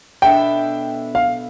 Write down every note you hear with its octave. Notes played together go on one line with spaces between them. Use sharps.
B2 B3 D4 A4 E5 G5
F5